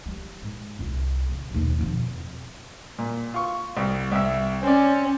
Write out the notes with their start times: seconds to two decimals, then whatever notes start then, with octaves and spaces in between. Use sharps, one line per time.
0.06 G3
0.42 G#2
0.79 C2 F4
1.30 C#3
1.51 D#2 B2
1.81 F2 B2
2.98 A#2
3.34 F4 C#6
3.77 C2
4.12 C2 E5
4.63 C4 C#4 D5